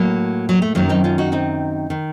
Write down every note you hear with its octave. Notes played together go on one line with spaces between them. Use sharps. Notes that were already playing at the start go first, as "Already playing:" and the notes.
Already playing: A2 F#3 A#3
F#3
A3
F#2 D#3 F#3 A#3
C4 D#4
C#4 F4
D#4 F#4
C4 D#4
D#3